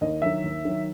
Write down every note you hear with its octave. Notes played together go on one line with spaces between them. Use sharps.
D#2 D#5
D#3 F#3 E5
D#2
D#3 F#3